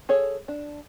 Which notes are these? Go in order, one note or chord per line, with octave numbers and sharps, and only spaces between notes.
G#4 A4 C#5
D4